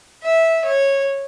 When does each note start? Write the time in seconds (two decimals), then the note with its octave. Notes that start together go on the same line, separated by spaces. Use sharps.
0.24 E5
0.65 C#5